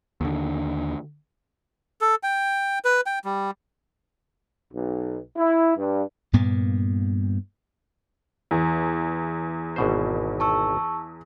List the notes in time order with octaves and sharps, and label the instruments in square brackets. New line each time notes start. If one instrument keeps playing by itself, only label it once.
[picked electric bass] D#2 D3
[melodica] A4
G5
B4
G5
G3
[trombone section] B1
E4
G2
[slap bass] G2 A#2 A#3 B3
[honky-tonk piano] E2
[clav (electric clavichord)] G#1 B2 C5
[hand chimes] A5 C#6 E6